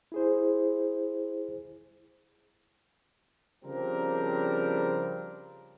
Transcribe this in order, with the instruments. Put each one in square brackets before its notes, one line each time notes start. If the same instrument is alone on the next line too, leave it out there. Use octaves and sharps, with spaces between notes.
[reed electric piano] E4 G#4 C5
[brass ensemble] C#3 F3 G3 C4 D4 A#4